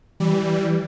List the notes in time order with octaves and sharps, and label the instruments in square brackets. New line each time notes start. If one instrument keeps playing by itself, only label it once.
[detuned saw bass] E3 [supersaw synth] G3